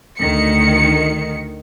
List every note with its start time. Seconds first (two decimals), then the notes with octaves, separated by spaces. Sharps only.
0.19 D2 D#3 C#7